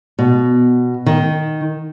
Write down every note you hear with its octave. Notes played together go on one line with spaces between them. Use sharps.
B2
D#3